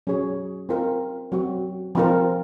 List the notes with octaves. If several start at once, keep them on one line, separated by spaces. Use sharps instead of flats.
F#3 C#4 G#4 C#5
C4 F4 A#4
F#3 C4 F#4
F3 C4 F4 A#4